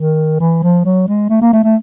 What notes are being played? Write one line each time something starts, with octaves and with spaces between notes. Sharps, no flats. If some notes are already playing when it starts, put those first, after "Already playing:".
Already playing: D#3
E3
F3
F#3
G#3
A3
A#3
A3
A3